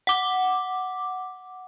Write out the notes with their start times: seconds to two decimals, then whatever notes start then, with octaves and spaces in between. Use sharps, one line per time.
0.07 F#5 D6